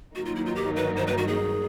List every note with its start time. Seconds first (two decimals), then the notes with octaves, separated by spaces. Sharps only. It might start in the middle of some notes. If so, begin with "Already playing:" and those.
0.15 G2 D#3 F#3 A#3 D#4 F#4
0.25 F4
0.36 E4
0.46 F4
0.56 G4
0.76 B4
0.96 C5
1.07 B4
1.18 F#4
1.28 G#4